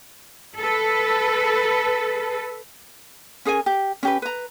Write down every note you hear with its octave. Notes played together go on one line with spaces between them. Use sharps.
A4 B4
C#4 G#4 A#4 G#5
G4
C#4 G4 B4
B4 A#5